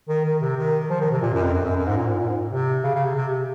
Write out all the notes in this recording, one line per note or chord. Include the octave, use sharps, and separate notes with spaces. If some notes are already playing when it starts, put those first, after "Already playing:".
D#3
D#3
C3
D#3
F3
D#3
C3
A#2
F#2
F2
F#2
F#2
F#2
G#2
A#2
G#2
A#2
G#2
C3
C#3
C#3
C3
C3